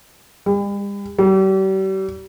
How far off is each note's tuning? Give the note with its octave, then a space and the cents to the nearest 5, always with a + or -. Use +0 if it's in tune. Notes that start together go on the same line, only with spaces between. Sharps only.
G3 +45
G3 -40